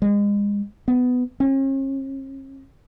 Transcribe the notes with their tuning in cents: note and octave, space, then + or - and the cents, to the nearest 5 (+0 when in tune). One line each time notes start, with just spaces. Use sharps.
G#3 -30
B3 +15
C#4 -45